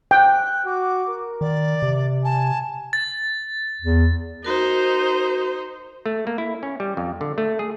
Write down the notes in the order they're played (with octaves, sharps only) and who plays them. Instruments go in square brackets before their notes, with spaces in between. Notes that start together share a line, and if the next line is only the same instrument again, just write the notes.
[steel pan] G5 [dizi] F#6
[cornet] F#4 [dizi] D6
[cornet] A#4
[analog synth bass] D#3 [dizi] D5
[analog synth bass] C3
[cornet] G#5 [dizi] A5
[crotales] A6
[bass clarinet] E2
[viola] D#4 C5 [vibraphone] F#4 A#4
[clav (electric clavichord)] A3
A#3
E4
C#4
G3
F2
D3
A3
G#4